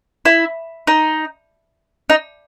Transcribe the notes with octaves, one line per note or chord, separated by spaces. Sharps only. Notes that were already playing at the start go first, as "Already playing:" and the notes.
E4
D#4
D#4